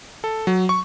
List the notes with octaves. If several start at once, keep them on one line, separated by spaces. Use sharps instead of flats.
A4
F#3
C#6